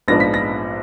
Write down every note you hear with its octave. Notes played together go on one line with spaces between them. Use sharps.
A#1 G#2 F3 B3 D4 A#6
B6
A#6